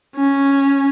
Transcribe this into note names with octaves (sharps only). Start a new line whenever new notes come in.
C#4